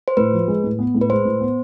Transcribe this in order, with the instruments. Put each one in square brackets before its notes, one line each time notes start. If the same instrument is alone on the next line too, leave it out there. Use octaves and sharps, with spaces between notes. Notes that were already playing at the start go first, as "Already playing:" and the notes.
[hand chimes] C5
[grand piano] A2 [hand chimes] B4
[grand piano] F3
G#3
A2
B3
A2
[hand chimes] B4
[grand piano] G#3 [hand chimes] C5
[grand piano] A2
B3